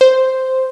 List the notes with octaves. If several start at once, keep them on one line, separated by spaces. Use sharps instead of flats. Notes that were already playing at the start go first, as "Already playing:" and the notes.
C5